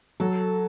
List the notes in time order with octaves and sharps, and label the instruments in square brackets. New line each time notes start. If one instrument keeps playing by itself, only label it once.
[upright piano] F#3 [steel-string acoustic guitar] A4